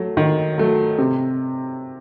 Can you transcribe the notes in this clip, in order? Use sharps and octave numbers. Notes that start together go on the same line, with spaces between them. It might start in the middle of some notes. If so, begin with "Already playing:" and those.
Already playing: F#3 A3
D#3
F#3 A3
C3